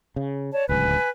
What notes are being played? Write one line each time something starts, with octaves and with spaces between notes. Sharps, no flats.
C#3
C#5 D5 A5
D1 C#2 B4 G#5